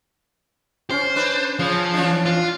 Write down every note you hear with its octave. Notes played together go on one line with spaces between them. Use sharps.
C#4 C5
D4 B4
C#3 F3
E3 C#4 D4
F4